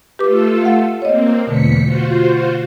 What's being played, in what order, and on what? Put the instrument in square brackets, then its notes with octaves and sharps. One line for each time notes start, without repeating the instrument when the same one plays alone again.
[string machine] A3 F4 A4 [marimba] G4 B4 D6
[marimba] F5 F#5
[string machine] A#3 C4 [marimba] C#5 D#5
[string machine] E2 B6 C#7 [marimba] B2 D3 A3
[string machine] F4 F#4 C5